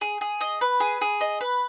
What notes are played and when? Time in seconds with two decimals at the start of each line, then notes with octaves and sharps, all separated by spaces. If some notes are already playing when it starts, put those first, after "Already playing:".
0.01 G#4
0.21 G#4
0.41 D#5
0.61 B4
0.80 G#4
1.01 G#4
1.21 D#5
1.41 B4